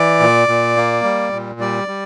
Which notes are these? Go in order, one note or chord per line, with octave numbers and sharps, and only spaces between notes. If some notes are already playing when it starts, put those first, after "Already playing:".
Already playing: E3 D5
A#2
A#2
A#3
G3
A#2
G3 D5
G3